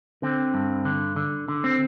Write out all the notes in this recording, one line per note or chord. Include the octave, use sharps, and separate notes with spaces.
D3 C4
G2
D3
D3
D3
C4